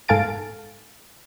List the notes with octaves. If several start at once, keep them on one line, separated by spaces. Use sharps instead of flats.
G#2 A4 F5 G#5 A6 D7